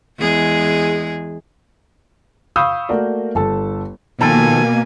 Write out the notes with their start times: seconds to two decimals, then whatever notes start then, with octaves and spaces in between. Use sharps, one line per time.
0.18 E2 G#3 G#4
2.56 F5 B5 C#6 D#6 E6 G6
2.89 A3 A#3 F#4 A#4 D5
3.35 G1 A4 A5
4.21 B2 D#3 F3 A#3 A4 G#5